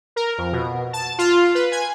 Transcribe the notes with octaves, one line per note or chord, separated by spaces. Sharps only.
A#4
F2
B2
A5
F4
B4
G#5